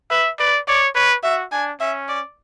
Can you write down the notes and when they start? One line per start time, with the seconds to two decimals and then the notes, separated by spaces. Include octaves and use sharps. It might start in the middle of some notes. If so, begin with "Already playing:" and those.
0.10 B4 E5
0.39 B4 D5
0.68 C#5 D5
0.95 B4 C#5
1.24 F#4 E5
1.52 D4 G#5
1.80 C#4 E5
2.09 D5